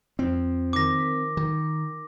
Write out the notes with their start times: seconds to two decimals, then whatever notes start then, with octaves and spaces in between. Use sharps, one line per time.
0.19 F2 C4
0.73 D#3 A#3 D#4 D6 A#6
0.99 B6
1.37 D#3